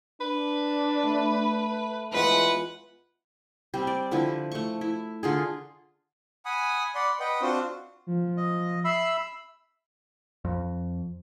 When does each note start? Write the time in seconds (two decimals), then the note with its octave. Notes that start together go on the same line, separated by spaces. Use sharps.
0.21 D4 B4
1.03 A3
2.12 E2 E3 G#3 F4 B4 F#5
3.74 G3 C4
3.87 D5
4.11 D3 F3 E4 B4
4.51 A3 C#6
4.81 E4
5.23 D3 F4 G#4
6.46 F#5 G#5 B5 D#6
6.95 D5 F#5 B5 C6
7.20 B4 D#5 F#5 G5
7.41 C4 D4 F4 F#4 C5
8.07 F3
8.37 D#5
8.85 E5 B5 E6 C7
10.45 F2